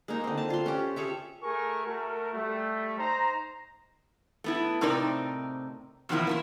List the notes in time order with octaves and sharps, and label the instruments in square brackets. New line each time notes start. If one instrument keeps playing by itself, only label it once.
[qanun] G#3 A#3 D#4
D3 C4
A5
F4 C6
C#4 G4
G#4 A4 C#5 E5
[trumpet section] A3 G#4 A#4 G#5 C#6
A3 F#4 A#4
G3 A3
D#4 C5 A#5
[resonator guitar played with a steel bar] A3 B3 E4
A2 C3 C4 D#4 A#4 D5
E2 B2 D#3 F3 A#3 E4
A#3 D4 E4